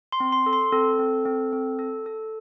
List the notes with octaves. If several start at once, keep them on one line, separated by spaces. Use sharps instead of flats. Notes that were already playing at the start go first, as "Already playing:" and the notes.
C6
C4
C6
A4
C6
C4 A4
C4
C4
C4
A4
A4